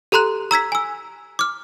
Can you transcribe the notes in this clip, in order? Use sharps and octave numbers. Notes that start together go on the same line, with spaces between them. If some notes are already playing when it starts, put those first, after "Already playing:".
G4 A4 A#5 C6 F#6
A#5 E6 G#6 B6
G#5 E6
D6 F6